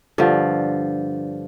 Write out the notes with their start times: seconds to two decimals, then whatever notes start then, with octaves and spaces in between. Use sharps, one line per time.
0.18 G2 D3 F3